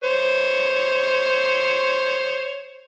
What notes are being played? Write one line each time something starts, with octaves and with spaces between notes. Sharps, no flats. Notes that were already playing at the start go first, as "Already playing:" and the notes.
C5 C#5